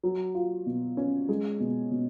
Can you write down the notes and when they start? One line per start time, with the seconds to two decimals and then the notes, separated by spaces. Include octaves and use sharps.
0.03 F#3
0.35 F4
0.66 B2
0.97 C#4
1.29 G#3
1.60 B2
1.91 B2